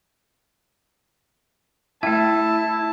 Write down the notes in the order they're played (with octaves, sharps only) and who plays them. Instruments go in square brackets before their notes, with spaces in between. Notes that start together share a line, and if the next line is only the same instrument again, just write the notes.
[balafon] A3 G5 [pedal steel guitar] E4 [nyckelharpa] A5